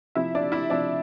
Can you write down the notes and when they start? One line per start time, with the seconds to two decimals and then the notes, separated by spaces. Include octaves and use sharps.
0.15 C3 F3 E4 E5
0.35 D4 D5
0.52 E4 E5
0.70 C3 F3 D4 D5